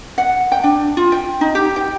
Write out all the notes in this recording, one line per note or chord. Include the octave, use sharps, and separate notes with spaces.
F#5
G5
D4
F4
G5
D#4
G4
G5